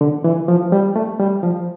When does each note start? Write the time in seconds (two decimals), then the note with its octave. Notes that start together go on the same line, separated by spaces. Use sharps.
0.01 D3
0.24 E3
0.48 F3
0.72 G3
0.96 A3
1.20 G3
1.43 F3